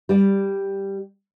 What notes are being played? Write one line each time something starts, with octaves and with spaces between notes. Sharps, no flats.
G3 D5